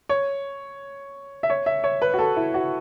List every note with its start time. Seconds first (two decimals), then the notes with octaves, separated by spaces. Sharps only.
0.09 C#5
1.43 E5
1.50 C#5
1.66 E5
1.84 C#5
2.02 B4
2.14 F#4
2.19 A4
2.37 E4
2.54 F#4